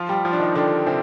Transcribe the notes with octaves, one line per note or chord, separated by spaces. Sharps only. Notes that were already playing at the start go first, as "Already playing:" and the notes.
Already playing: F3 F4
G3 G4
F3 F4
D4
D#3 D#4
D3 D4
C3 C4